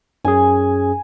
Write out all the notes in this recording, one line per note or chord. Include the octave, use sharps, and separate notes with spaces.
F#2 C#4 G#4 G#5